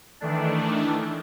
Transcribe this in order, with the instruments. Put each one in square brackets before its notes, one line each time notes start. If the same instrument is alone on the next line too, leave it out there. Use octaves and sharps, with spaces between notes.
[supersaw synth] D#3 E3 A3 D4